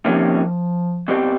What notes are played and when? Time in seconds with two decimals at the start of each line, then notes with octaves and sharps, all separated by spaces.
0.05 C3 D#3 F3 G3 A#3 C#4
1.08 B2 G3 C4